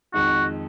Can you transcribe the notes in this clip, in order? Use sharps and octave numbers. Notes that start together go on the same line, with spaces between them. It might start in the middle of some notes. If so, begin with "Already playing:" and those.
F2 D#3 G#3 D#4 F#4